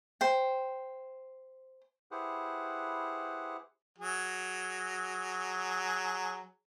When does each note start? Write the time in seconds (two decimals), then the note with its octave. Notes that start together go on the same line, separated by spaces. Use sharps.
0.21 C5 G5
2.11 E4 G4 G#4 B4 C5 F#5
3.98 F#3 G#4